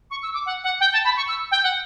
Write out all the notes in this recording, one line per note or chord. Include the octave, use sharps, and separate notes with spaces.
C#6
E6
D6
F#5
F#5
G5
A5
B5
C#6
E6
G5
F#5